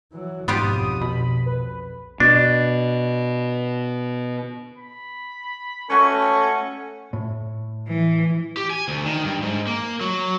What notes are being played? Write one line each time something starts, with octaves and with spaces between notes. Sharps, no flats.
E3 F#3
B1 F2 G#2 B3 F4 G4 D#6
B2 B5
B4
B2 D4
B5
A3 C#4 F#4 A4 C#5
A2
E3
G4
G#5
D2
D#3
G2
G#2
A#3
F#3